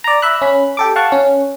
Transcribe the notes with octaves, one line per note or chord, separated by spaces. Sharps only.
D5 A#5
E5 B5 F#6
C#4 B5
G4 A4 D6
F5 F#5 A5 C#6
C#4